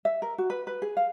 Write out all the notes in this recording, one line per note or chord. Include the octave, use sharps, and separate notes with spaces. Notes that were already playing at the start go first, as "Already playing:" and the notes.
E5
A#4
F#4
B4
B4
G#4
F5